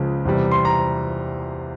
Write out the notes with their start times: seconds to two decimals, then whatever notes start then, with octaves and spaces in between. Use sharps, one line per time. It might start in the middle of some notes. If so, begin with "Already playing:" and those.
Already playing: C#2 C#3 F3 G#3
0.25 E2 C3 G3
0.51 C6
0.65 A#5